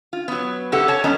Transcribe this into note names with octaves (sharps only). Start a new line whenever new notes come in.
F4
F#3 B3
C3 G4 A4 F#5
C#5 A5
F#3 G3 B3 C#4 D#5 A#5